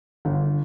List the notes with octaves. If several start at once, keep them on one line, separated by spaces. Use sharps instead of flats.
G1